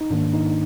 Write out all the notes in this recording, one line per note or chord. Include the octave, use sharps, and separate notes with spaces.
D#4
G#2 D#3 A#3 D4
D#4